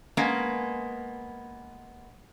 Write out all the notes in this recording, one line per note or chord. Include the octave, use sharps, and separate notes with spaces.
G#3 A#3 B3 C#4